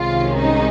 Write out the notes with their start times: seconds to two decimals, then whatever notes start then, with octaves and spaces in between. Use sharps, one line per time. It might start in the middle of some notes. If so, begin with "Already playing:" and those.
Already playing: C2 C3 D#3 G#3 C#4 F4
0.37 D#4